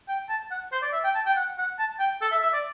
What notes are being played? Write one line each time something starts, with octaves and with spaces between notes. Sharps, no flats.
G5
A5
F#5
C5
D5
E5
G5
A5
G5
F#5
F#5
A5
G5
A4
E5
E5
D5